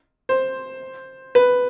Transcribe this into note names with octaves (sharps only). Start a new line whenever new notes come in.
C5
B4